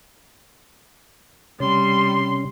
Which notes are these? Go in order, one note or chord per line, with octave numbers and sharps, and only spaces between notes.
C3 G3 C#4 C6